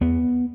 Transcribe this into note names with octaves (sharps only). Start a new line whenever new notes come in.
E2 B3